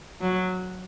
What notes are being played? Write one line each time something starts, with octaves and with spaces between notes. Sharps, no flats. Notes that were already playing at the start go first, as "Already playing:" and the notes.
F#3